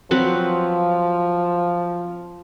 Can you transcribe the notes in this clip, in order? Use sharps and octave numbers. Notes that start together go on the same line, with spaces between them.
F3 F#3 C4 B4